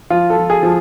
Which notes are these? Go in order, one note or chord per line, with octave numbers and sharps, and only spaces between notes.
F3 F4
A4
F3
G#4
F3